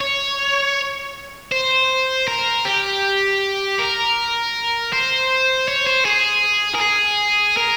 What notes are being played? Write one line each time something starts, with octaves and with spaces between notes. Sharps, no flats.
C#5
C5
A#4
G4
A#4
C5
C#5
C5
G#4
A#4
G#4
A#4